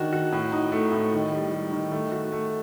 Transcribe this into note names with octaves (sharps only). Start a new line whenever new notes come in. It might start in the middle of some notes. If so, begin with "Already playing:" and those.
Already playing: D#3 D4 F#4
F#4
A2
D#4
A3
A2
D#3
G3
G3
D#3
A3
F#4
A3